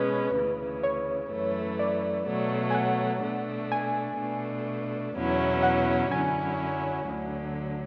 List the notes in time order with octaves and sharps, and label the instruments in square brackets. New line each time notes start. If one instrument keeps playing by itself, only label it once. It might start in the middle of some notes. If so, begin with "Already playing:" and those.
Already playing: [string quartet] B2 G#3 C#4 [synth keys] B4
[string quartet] D2 C#3 E3
[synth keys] C#5
[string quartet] F#2 E3 A3
[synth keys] D5
[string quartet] B2 F#3 A3
[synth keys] G#5
F#5
[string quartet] B2 A3 D4
[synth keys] G#5
[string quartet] B2 A3 D4
E2 B2 F#3 C#4 E4
[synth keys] F#5
[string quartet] F#2 D3 F#3 C#4 E4 [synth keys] G#5
[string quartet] D2 D3 F#3